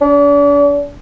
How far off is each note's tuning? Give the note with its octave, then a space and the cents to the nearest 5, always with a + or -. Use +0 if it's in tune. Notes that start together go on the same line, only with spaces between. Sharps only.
D4 -40